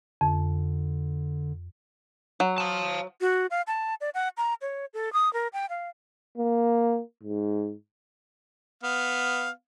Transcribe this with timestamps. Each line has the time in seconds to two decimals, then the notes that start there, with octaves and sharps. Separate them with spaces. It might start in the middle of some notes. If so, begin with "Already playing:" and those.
0.21 F2 D3
2.40 F#3
2.58 F5 A5
3.21 F#4
3.51 F5
3.67 A5
4.01 D5
4.14 F#5
4.37 A#5
4.62 C#5
4.94 A4
5.13 D#6
5.33 A#4
5.53 G5
5.69 F5
6.38 A#3
7.23 G#2
8.83 B3 F5